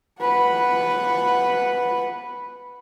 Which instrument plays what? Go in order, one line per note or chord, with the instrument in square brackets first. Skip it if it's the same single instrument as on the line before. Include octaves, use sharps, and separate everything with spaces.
[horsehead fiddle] B4 F#5